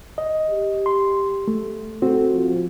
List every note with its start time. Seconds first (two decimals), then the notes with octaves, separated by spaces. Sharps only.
0.18 D#5
0.50 G4
0.86 C6
1.48 A3
2.02 C4 F#4 A4
2.34 F3